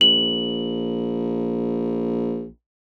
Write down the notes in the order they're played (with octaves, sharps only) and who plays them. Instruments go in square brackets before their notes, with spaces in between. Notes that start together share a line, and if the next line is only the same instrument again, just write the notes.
[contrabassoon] A#1 [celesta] F#7